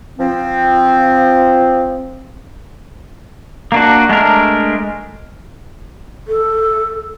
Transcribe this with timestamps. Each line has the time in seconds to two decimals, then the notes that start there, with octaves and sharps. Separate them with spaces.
0.19 F3 C4
3.72 A#3 D4 F#4
4.09 G#3 A3 D4 A#4
6.28 A4